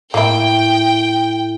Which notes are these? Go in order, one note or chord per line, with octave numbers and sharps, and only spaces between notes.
A2 A#3 E4 G5